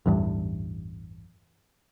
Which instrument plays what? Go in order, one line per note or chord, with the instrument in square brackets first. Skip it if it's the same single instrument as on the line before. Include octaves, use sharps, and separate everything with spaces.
[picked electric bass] A1 E2 G2